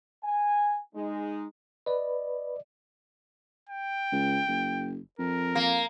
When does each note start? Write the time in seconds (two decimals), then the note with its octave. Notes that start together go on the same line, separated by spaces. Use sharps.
0.24 G#5
0.95 G#3 D#4
1.86 B4 D5 D#5
3.69 G5
4.12 C#2
4.48 F#1
5.19 F2 A#4
5.55 A#3